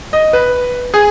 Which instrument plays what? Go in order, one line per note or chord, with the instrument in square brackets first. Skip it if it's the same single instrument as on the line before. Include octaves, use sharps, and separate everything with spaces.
[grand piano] D#5
B4
G#4